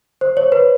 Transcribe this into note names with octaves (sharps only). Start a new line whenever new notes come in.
C5
C#5
B4